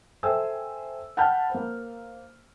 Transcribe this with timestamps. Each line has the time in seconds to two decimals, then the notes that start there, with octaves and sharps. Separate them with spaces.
0.23 A4 C5 E5 G5 G#5 E6
1.17 F#5 G5 A5 B5 F6 G6
1.50 A#3 C5